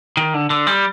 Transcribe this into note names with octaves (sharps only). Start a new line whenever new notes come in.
D#3
D3
D3
G3